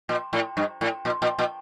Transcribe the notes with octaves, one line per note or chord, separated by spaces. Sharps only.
A#2
A2
G2
A2
A#2
A#2
A#2